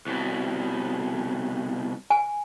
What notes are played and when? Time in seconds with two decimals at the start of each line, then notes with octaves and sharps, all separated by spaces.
0.07 C2 B2
2.10 G#5